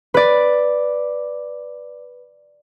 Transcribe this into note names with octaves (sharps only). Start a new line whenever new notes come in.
B4 D5